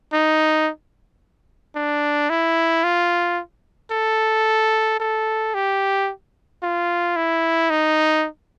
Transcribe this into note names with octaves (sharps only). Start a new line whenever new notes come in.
D#4
D4
E4
F4
A4
A4
G4
F4
E4
D#4